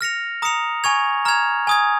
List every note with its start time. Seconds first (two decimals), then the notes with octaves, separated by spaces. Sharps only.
0.01 F6 A#6 C#7 F7
0.42 A#5 D#6 C#7 F7
0.84 G#5 C#6 G#6 F7
1.25 A#5 F6 G#6 F7
1.67 G#5 D#6 G#6